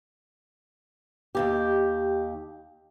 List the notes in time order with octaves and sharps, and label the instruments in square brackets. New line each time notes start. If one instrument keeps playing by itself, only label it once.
[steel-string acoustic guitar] D#2 G#2 G4